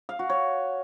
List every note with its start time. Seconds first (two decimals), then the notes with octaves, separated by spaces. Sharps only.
0.09 F5
0.19 F#4
0.30 C#5